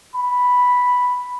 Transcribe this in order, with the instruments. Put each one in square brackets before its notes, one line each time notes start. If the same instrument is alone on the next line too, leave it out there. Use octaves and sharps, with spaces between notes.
[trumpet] B5